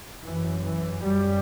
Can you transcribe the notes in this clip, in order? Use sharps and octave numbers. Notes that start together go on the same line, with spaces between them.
F#2 E3
E3
F#2 G3